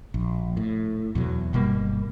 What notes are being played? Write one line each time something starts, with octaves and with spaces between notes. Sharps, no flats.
A#1
A2
E2 B2 F#3
G1 B2 G3 A#3